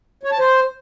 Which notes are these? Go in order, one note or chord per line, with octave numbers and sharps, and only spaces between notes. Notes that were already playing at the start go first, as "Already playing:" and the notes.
C#5
A5
C5